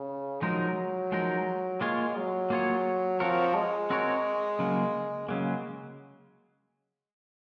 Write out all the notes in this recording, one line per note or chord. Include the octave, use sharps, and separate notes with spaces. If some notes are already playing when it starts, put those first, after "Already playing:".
Already playing: C#3
F3 F#3 G#3 D#4 A#4
F3 G#3 D#4 A#4
G#3 A#3 F4 G#4 C#5
F#3
A#3 F4 G#4 C#5
F3 C4 F#4 A#4 C#5
G#3
C4 F#4 A#4 C#5
C#3 F#3 A#3
C#3 F#3 G#3 A#3